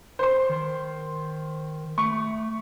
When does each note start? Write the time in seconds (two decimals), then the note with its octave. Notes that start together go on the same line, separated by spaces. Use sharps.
0.19 C5 C6
0.50 D#3
1.98 A3 C#6